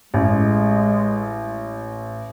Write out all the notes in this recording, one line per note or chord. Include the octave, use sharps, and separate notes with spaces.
A1 G#3